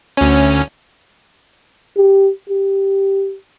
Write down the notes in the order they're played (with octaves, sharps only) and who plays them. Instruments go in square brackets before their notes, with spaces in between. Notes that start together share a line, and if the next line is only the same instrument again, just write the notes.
[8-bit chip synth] D2 C#4
[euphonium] G4
G4